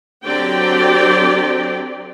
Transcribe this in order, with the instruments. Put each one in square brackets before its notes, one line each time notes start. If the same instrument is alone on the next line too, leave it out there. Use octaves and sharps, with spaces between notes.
[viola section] D3 F#3 C4 G4 D5 G5